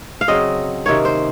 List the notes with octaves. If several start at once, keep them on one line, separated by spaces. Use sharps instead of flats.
F5
C#3 F#3 C4 D#5
C3 D#3 A#3 C#4 C#5
C5